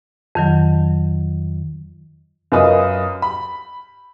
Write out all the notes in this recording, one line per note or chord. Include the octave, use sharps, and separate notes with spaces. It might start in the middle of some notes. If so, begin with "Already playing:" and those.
F2 D#3 F#3
F#2 F4 A#4 B4 D#5 D#6
B5